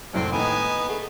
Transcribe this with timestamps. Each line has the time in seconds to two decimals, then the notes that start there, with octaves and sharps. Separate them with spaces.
0.13 C2 F2 A2 C4
0.32 D#2 A2 B3 D#4 G#5
0.89 A3 G#4